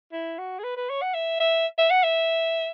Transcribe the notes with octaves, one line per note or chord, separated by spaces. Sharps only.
E4
F#4
G#4
B4
B4
C#5
F#5
E5
E5
E5
F#5
E5